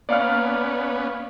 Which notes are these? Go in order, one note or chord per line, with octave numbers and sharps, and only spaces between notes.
A#3 B3 C#4 D5 F5 F6